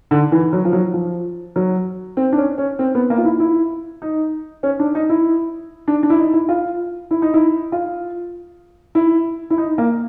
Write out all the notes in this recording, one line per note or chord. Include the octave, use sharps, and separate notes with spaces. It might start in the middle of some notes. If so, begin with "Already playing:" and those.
D3
E3
F#3
F3
F#3
F3
F#3
C4
D4
C#4
C#4
C4
B3
A#3
F4
E4
E4
D#4
C#4
D4
D#4
E4
D4
D4
E4
D#4
E4
F4
E4
D#4
E4
F4
E4
E4
D#4
A#3